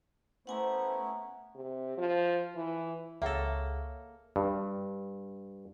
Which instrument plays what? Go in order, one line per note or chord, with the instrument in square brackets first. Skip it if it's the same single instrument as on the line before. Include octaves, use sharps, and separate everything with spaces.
[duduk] A3 [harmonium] B3 C#4 E4 [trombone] C5 [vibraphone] F#5 G#5 A#5
[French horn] C3
F3
E3
[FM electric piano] C#2 G#4 C#5 [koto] A#3 A4 [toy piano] E5 F#5
[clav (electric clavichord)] G2